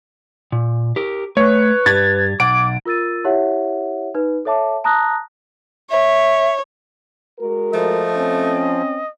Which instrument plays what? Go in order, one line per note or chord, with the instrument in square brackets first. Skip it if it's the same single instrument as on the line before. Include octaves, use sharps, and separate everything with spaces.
[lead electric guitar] A#2
G4 A#4
[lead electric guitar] A3 [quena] B4 [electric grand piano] C#5
[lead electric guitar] G2 G4 [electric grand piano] G#6 A6
[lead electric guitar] B1 F#5 [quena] D6 [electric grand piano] D7
[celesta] F4 A#4 E6 A6 D#7
E4 G4 C#5 E5 F#5
D#4 B4
A4 C#5 E5 A5 D6
A5 A#5 D#6 F#6 A#6
[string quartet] C#5 [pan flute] E5
[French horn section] G#3 F#4 A#4
[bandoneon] F3 [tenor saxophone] A3 [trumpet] D#5
[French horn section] C4 C#4